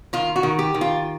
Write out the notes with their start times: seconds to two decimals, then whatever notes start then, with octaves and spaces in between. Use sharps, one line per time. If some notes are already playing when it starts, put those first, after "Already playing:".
0.13 D#3 F4
0.36 F#4
0.43 D#3
0.59 G4
0.74 D#3
0.81 F4